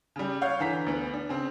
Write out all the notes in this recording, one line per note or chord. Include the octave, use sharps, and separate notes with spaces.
C#3 G3
C#5 F5 F#5 G6
D3 E3 A#5 B6
D2 B3
D4
C#3 C4